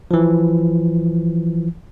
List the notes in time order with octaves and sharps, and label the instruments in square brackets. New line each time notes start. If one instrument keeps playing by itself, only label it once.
[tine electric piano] E3 F3